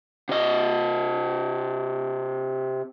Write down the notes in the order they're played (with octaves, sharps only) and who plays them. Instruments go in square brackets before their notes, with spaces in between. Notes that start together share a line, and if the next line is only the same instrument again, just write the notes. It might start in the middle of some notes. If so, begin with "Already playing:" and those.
[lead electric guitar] C3 D#5